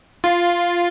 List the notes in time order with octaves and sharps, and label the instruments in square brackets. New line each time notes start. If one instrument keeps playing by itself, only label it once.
[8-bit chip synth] F4